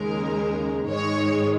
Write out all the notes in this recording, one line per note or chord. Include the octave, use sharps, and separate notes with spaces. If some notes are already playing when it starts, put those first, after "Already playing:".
Already playing: D#2 C#3 G#3 A#4
G#2 D#3 G#3 C#5